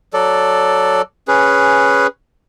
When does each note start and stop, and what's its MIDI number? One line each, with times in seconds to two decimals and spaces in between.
0.14 1.02 54
0.14 1.02 69
0.14 1.02 74
1.28 2.07 61
1.28 2.07 68
1.28 2.07 71